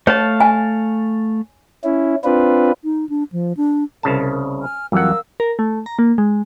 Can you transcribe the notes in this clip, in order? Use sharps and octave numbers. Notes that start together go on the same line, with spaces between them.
A3 C#5 F5 A5
G#5
C#4 E4
C4 D4 F4 B4
D#4
D4
F3
D4
C2 C#3 A#4 A5
G#5 F6
F2 E3 F#3 G3 A#4 F5 F#5 E6
A#4
A3
A#5
A#3
G#3